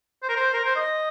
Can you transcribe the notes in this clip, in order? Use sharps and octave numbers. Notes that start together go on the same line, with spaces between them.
C5
A#4
C5
A#4
C5
D#5